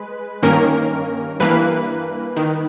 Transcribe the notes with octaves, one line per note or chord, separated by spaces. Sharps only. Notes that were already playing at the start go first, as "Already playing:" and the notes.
Already playing: G#3 B4
G2 D#3 A#3 C#4 A#4
G2 E3 A#3 B4
D#3